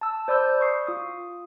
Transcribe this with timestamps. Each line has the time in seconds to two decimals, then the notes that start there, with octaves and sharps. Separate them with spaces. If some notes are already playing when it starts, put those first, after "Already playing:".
0.01 A5 E6
0.28 C5 D5 B5 E6 G6
0.61 C#6 D#6 C7
0.87 F4 D#6